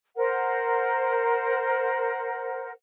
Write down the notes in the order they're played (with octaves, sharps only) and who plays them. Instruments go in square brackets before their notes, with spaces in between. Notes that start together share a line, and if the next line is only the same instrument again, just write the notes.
[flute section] A#4 C5 F#5